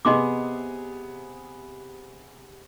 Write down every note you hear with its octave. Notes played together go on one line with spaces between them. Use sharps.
C3 B3 G#4 D#5 C6 D6